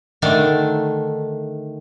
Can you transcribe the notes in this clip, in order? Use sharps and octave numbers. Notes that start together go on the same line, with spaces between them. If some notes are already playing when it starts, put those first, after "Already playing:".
D3 D#3 A3 D4